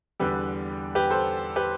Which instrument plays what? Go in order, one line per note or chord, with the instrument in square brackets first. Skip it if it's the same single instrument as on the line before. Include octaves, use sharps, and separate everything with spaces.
[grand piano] E2 D3 G3 G4 B4
G4 B4
A4 C5
G4 B4